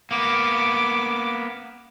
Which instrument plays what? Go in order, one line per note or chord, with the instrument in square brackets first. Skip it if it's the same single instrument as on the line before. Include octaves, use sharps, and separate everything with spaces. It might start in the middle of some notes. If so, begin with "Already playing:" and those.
[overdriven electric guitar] A#3 B3 [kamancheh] D6